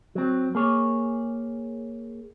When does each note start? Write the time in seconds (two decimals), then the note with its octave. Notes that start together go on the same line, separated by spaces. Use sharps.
0.15 F#3 C4
0.55 A#3 G#4 C#5